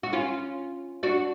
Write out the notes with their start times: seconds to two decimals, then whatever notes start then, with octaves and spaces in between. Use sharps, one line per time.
0.03 F#4
0.13 C#4 F4
1.03 D4 F#4